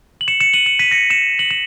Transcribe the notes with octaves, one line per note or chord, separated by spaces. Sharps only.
F#7
C#7 E7
C#7 E7
D#7 F#7
C#7 E7
B6 D#7
A#6 C#7
C#7 E7
F#7
E7